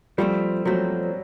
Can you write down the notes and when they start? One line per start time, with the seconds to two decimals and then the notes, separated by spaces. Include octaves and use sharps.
0.18 F3 G3 A3 C4
0.65 F3 F#3 A3 C4